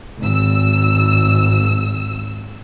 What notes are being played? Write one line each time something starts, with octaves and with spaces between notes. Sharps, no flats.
G#1 E6